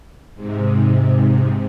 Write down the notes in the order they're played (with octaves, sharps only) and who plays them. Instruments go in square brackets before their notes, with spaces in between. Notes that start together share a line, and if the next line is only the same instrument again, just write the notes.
[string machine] G#2 C3